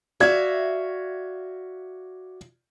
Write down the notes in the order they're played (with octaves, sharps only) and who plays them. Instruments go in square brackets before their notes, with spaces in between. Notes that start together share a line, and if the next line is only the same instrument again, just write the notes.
[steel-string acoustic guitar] F#4 E5 F5 [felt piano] D5 G#6